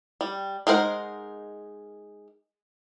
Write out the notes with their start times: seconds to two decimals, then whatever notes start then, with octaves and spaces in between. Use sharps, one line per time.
0.21 G3
0.67 G#3 D#4 A#4 C5 F#5